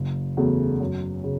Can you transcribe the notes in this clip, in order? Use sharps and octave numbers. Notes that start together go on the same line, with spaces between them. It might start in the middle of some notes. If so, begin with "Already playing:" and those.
Already playing: F#1
E2 C#3 F#3 A3
F#2
C#3